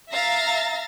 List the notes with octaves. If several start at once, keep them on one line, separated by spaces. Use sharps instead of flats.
E5 F5 A#5 A6 A#6